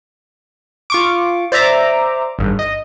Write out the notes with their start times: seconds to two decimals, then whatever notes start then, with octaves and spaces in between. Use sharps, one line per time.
0.90 F4 C#6 D6
1.52 C5 D5 E5 A#5 D6
2.39 G#1 G2
2.59 D#5